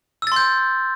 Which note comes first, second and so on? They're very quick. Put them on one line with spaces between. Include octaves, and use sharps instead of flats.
E6 A6 C6 G6